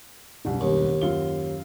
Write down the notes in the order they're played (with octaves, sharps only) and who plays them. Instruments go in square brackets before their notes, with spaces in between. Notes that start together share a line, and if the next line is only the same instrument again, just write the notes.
[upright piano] E1 C2 F#2
[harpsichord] D#2
[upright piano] F#2 F4 G7